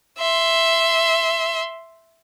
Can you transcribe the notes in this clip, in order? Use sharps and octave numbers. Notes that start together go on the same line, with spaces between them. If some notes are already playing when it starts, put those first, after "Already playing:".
E5 C6